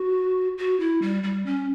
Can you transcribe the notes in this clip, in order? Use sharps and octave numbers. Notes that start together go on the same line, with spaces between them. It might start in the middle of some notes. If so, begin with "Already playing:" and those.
Already playing: F#4
F#4
E4
G3
G3
C#4